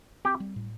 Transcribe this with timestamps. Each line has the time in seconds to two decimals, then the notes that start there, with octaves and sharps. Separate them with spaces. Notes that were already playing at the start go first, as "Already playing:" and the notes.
0.25 C4 G4
0.40 G3
0.56 A2